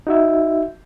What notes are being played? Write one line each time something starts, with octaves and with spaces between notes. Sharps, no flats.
D#4 F#4 E5